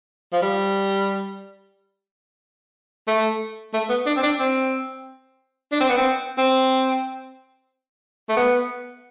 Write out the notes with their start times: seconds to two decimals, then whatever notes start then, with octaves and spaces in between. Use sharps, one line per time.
0.33 F3
0.42 G3
3.07 A3
3.74 A3
3.90 B3
4.06 D4
4.17 C4
4.23 D4
4.40 C4
5.72 D4
5.81 C4
5.89 B3
5.98 C4
6.38 C4
8.29 A3
8.37 B3